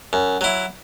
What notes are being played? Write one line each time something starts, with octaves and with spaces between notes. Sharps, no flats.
F#2
F#3 E4